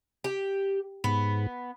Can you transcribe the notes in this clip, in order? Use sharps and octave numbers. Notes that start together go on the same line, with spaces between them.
G4
G#2 B3